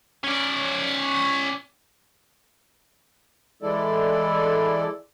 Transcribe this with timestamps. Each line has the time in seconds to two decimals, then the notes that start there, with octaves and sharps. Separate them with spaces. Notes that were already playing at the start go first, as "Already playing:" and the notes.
0.24 C#4 D5
3.62 E3 G#3 E4 A4 D5